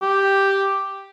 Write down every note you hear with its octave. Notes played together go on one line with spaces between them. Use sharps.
G4